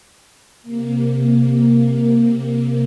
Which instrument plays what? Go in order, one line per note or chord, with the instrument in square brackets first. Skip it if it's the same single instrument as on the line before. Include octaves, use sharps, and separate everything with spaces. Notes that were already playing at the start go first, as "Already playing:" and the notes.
[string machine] C3 A#3